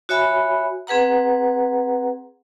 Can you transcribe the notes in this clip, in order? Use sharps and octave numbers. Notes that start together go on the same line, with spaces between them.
F#4 C#5 E5 G#5 B5
C4 G#4 B4 F#5 A#5